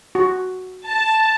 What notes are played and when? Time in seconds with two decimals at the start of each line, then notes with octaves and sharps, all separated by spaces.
0.15 F#4
0.86 A5